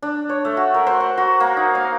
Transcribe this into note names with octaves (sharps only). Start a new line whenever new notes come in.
D4
C#5
A3
F#4
A#4
C5
F#5
F#4
A#3
D#4
F5